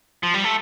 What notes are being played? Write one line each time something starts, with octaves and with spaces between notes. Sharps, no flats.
F3
G3
A3